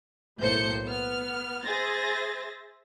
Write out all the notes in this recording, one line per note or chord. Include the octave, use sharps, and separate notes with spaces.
B1 A2 A#3 C5 G6 C#7
B3 F6
G#4 C5 E5 A6 A#6